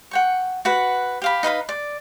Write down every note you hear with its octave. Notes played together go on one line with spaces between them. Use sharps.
F#5 G5 C#6
F#4 B4 F#5
G4 F5 B5
D#4 B4 F5 B5
D5